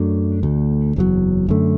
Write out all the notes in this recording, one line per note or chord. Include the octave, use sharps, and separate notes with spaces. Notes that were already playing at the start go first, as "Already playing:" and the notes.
Already playing: F#2 F#3 A3 D4
D2 D3 A3
F#1 E2 B2 F#3
F#2 D3 A3